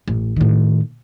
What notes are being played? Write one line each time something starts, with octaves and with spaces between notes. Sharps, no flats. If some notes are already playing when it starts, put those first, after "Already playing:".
A1
A2 D#3